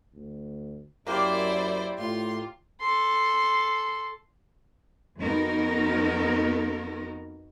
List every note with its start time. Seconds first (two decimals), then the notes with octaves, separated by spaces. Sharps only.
0.14 D2
1.06 F#2 A#3 E4 G4 C5 D5
1.98 A2 F4 C6
2.81 A4 C6
5.20 F2 B3 D#4 F#4 A#4